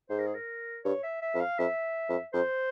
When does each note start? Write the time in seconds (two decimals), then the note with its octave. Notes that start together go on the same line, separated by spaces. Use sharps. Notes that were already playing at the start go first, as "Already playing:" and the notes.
0.10 G#2 C5
0.19 A#4
0.26 G#4
0.35 A#4
0.84 G2 C#5
1.03 E5
1.22 E5
1.35 F2
1.41 F5
1.59 F2 E5
2.09 F2
2.33 F2 C5